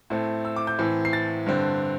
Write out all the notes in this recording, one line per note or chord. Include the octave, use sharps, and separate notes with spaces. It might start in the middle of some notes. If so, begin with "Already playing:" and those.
A2 A3 C4
E6
D6
G6
A2 E3 C4
C7
A6
G2 D3 C4